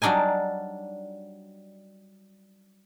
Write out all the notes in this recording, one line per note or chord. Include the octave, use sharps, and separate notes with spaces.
F#3 G3 D4 D#4 G#5